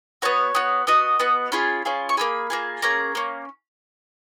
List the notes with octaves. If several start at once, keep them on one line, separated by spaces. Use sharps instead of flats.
B3 F#4 C#5
B3 F#4
B3 F#4 D#5
B3 F#4
C#4 F4 G#4 B5
C#4 F4 G#4
C#6
A#3 F4 G#4 B5
A#3 F4 G#4
A#3 C#4 G#4 A#5
A#3 C#4